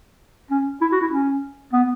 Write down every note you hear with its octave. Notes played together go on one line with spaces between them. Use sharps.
C#4
E4
F#4
E4
C#4
B3